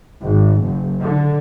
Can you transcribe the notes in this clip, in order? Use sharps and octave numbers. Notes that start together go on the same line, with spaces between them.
G#1
F#1
D3